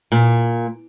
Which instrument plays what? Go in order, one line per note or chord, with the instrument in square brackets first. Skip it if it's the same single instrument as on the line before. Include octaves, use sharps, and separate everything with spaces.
[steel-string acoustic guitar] A#2